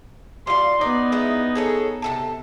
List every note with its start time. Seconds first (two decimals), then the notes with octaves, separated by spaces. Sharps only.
0.47 G3 F4 C6
0.81 B3 D#4 D5
1.12 G#3 E4 B4
1.55 G#4 A4 C#5
2.02 C3 A4 A5